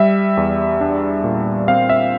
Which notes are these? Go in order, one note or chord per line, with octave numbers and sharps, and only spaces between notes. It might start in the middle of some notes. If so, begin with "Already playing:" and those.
Already playing: G3 E5
E2
D4
A#2
C4 F5
E5